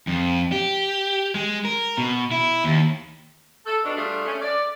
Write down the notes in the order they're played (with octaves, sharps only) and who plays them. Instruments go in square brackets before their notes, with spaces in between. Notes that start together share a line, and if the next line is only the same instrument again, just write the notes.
[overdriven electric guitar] F2
G4
G#3
A#4
B2
E4
D#2
[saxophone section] A4
B2 D4
G3 A3 D4 F4 G#4
A3 C#4
D5